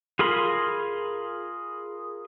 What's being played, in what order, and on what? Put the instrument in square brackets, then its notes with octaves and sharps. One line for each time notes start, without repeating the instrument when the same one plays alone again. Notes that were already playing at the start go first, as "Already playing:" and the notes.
[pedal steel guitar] F4 G#4 A#4 B5 C6